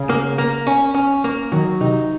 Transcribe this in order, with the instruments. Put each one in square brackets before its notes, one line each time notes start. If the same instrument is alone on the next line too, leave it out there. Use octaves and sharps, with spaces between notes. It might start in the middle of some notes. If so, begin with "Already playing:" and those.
Already playing: [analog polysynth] C#3
[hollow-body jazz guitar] A#3
A#3
C#4
C#4
A#3
[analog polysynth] D#3 [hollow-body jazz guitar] F#3
[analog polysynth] C3 [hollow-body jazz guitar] D#4